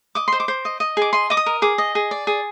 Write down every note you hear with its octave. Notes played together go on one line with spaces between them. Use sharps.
D#5 D6
C5 C6
D6
C5
D#5
D#5
G#4 D6
D#5 C6
D#5 D6
D#6
A#4
G#4 D6
D#5
G#4
D5
G#4